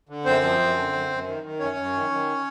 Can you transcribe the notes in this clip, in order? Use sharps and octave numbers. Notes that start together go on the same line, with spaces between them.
D3
F#2 C4 C5
F3
F#2
D3
F#2
F#2
D#3
D#3
F#2 C#4 C#5
F#2
D#3
D#3